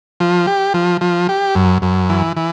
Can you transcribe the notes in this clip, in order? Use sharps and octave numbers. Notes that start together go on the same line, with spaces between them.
F3
G4
F3
F3
G4
F#2
F#2
E3
E3